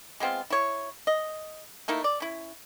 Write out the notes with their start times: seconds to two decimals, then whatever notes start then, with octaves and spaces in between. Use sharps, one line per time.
0.20 G#3 B3 C4 F4
0.50 E4 C#5
1.07 D#5
1.88 A3 A#3 D#4 E4
2.04 D5
2.20 C#4 E4